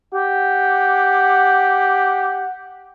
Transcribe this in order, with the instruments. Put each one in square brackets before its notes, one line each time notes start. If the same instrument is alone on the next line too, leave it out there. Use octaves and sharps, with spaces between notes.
[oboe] G4 [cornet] F#5